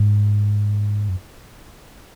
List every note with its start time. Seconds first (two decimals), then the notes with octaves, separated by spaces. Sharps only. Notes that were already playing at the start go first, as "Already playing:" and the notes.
Already playing: G#2
1.09 F#2